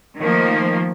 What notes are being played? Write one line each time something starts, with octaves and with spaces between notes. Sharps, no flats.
D#3 F3 A3 A#3